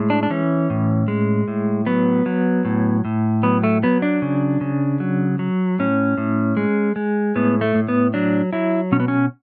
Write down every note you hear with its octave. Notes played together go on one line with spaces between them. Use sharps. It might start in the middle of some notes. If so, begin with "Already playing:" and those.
Already playing: A2 G#3
D4
D4
E3 C#4
A2
G#3
A2
F#3 B3
F#3
A2
A2
F#3 B3
A3
F#3 B3
D4
C#3
C#3
F#3
F#3
A2 C#4
A2
G#3
G#3
A2 B3
A3
A2
B3
F#3 D4
F#3 E4
B2 C#4
B3
C#4